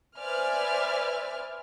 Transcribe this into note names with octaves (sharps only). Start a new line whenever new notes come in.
B4 C5 D5 E5 G#5 F6